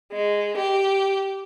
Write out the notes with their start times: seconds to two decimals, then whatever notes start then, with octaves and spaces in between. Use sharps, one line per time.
0.12 G#3
0.58 G4